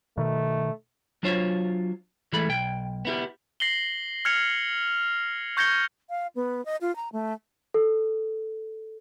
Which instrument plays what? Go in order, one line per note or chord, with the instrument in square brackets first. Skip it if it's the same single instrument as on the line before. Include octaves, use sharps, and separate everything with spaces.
[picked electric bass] B2 D#3 [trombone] A3
[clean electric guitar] F#3 D4 F4 C5 C#5
E3 G#3 A3 B5
B1 G5
B3 E4 G4
[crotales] A#6 C7 F#7 G7
F6 G#6 C#7 F7
C#6 G6 G#6 A#6 C#7 G7
[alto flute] F5
B3
D#5
F4
A#5
A3
[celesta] A4